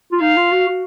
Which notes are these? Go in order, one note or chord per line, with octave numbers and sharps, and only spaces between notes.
F4
D#4 F5
F4
F#4
F#4